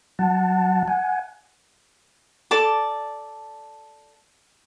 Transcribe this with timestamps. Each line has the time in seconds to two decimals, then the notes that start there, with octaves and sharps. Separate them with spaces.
0.19 F#3 F#5 A5
0.88 F#5 G#5
2.51 A4 D5 A5 D6